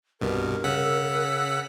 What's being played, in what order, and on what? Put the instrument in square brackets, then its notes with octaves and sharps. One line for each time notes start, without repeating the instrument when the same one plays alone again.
[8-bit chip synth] C2 G2 B2 [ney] A#4
[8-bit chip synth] C#3 F#5 B6 [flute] E6